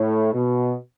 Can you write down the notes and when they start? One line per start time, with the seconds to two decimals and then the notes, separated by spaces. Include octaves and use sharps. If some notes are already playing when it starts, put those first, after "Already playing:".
Already playing: A2
0.33 B2